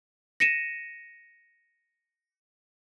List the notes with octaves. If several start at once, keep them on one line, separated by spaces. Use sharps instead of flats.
A#6 C#7 D#7 E7